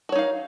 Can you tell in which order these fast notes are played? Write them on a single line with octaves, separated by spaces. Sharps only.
F#4 C#5 D#4 F5